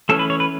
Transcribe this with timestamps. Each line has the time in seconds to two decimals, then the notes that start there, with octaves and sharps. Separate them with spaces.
0.09 E3 A3 C#4 A4
0.19 B4
0.30 C#5
0.40 B4